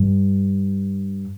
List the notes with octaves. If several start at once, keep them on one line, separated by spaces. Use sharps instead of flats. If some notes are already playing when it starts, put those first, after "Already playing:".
Already playing: G2